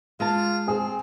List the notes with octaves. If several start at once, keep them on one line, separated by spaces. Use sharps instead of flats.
G#3 F4 A5
C4 G#4